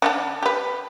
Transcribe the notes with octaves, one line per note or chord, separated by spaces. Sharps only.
D3 C#4 D4
G4 B4